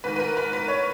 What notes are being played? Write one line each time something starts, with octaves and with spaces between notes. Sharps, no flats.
G#2 D#3 B4
B4
A#4
B4
B4
C#5